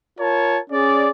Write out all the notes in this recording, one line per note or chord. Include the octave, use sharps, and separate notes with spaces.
F4 A#4 C#5 A5
C#4 G#4 D5